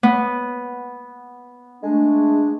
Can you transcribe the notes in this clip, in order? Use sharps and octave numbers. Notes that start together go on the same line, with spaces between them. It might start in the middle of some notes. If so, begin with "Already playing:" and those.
B3
G#3 A3 D4